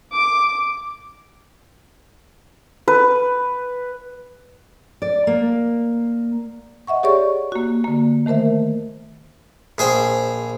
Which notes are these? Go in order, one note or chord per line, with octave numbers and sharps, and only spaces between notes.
D6
B4
D5
A#3
D#5 E5 F#5 C#6
G4 G#4 C#5 D5 C#6
A#3 F#4
D3 A#3
D#3 A3 A#4 C5 E5
A#1 G#4 C5 G5